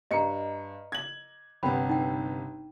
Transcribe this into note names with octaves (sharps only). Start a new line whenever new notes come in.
G2 D#5 A#5 C#7
G#6 F#7
G1 C3 B3 G5 B5
D#4 G5